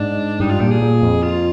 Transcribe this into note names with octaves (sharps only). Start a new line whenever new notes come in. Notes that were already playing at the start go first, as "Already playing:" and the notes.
Already playing: G#2 D4
G2 D#4
F4
A#2 G4
G#4
A#2
F2
F4